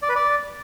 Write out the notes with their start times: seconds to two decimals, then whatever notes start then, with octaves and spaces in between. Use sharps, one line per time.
0.02 D5
0.09 B4
0.16 D5